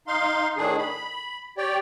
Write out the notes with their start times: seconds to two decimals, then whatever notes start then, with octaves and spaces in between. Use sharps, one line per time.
0.07 D#4 F5 C6
0.57 A2 D#3 D4 G#4
0.78 B5
1.57 G4 C#5 D5 G5